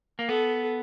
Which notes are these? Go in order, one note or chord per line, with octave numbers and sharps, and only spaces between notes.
A#3
B3 A4